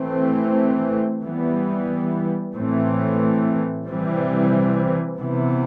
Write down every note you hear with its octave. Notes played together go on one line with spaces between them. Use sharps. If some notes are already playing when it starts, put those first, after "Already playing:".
Already playing: E3 A3 C4
E3 G3 B3
A2 E3 A3 C4
C3 E3 G3 C4
C3 E3 B3